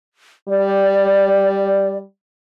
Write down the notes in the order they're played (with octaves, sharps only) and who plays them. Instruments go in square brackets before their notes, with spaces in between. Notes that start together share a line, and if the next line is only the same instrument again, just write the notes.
[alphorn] G3 [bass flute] D5